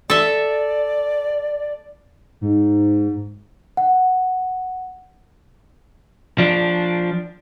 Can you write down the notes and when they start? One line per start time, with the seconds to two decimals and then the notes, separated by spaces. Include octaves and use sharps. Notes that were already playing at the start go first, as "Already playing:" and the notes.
0.10 A4 D5 E5
2.41 G#2
3.77 F#5
6.38 F3 D4